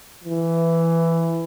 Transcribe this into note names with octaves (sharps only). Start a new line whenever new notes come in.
E3